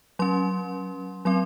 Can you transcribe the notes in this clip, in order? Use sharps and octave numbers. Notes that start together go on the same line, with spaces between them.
F#3 C#4 C6
F#3 C4 C6